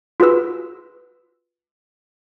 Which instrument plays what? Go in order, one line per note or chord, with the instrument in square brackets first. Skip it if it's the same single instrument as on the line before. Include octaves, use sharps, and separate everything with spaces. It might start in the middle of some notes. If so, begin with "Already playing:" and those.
[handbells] F4 F#4 G#4 B4 E6